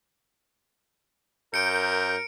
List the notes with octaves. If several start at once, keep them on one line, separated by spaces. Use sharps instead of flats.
F#2 A#4 G6 C#7 D7